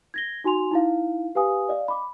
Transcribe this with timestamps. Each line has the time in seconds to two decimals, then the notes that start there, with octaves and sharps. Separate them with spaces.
0.14 G#6 A#6 G7
0.44 D#4 F#4 G#5 C6 F7
0.71 D#4 E4 F5
1.35 G4 B4 F5 G#5 D#6
1.69 D5 D#5 F5
1.88 B5 D6